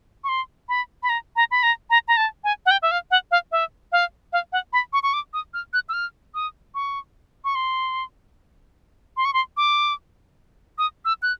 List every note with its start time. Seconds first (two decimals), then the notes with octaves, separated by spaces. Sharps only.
0.24 C#6
0.29 C6
0.69 B5
1.03 B5
1.09 A#5
1.36 A#5
1.51 B5
1.63 A#5
1.90 A#5
2.08 A#5
2.17 A5
2.44 G#5
2.66 F#5
2.71 G5
2.82 E5
2.91 F5
3.11 F#5
3.31 F5
3.52 E5
3.92 F5
4.33 F5
4.52 F#5
4.73 B5
4.93 C#6
5.03 C#6
5.13 D6
5.33 D#6
5.54 F6
5.73 F#6
5.89 E6
5.93 F6
6.34 D#6
6.75 C#6
7.44 C#6
7.55 C6
9.17 C6
9.25 C#6
9.34 C6
9.57 D6
10.78 D#6
11.05 E6
11.22 F#6